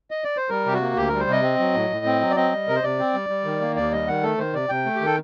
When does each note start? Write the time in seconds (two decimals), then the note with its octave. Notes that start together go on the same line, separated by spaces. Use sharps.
0.11 D#5
0.24 D5
0.37 C5
0.49 G3 A#4
0.66 C3 G4
0.73 F#4
0.81 A#3
0.96 D2 G4
1.08 G3 A#4
1.20 C5
1.27 C3 D#5
1.43 C4
1.59 F#3
1.74 A2
1.90 A2
2.05 C4
2.21 F#3
2.31 D5
2.36 C4 D#5
2.53 G3
2.68 C3 A#4
2.76 C5
2.83 C3 D5
2.99 C4
3.14 G3
3.30 G3
3.45 D#3
3.61 A#3
3.76 D#2 D5
3.92 G3 D#5
4.08 D#3 F#5
4.23 A3 A4
4.38 D#3 C5
4.53 C3 D5
4.69 C3 G5
4.85 A3
4.95 G4
5.01 D#3 A4